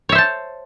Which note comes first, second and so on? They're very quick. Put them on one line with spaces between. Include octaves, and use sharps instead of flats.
C#5 E5 C5 A5